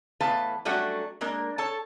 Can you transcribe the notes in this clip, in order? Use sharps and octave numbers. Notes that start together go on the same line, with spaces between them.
E2 A2 B4 F5 A5
F#3 G3 A3 C#4 D4 F#4
G#3 A#3 D4 A#4
A4 C#5 A5